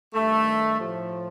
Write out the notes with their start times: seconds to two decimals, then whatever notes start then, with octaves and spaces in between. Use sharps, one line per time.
0.14 G2 D#3 A3
0.80 A2 F3